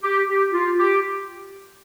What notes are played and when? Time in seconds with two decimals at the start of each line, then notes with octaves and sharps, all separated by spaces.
0.03 G4
0.28 G4
0.52 F4
0.79 G4